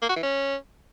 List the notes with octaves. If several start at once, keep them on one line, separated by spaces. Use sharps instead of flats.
A#3
F#4
E3
C#4